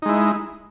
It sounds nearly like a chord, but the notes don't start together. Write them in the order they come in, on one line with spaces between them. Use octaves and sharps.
D#4 G#3 E4